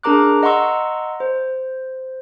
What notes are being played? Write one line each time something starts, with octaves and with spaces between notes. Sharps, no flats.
D4 G#4 A#4 A#5 D6 F#6
D#5 F#5 A#5 C6 C#6 E6
C5